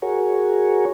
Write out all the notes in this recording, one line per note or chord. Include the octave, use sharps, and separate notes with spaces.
F#4 G#4 A#4 C#5